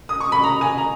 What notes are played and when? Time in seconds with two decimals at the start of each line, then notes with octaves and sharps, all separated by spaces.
0.09 D#6
0.20 C#6
0.32 B5
0.44 A#5
0.61 G#5
0.78 A#5